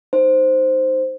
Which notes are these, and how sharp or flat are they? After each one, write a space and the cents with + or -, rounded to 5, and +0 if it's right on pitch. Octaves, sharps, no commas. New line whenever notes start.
D#4 +0 C5 +0